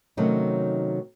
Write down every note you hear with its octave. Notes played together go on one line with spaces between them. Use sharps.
C3 D#3 F#3 A3 C#4 D#4